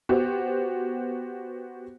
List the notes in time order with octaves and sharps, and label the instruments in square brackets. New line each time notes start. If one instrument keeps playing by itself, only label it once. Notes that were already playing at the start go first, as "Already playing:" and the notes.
[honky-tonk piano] B3 F#4 G4 C5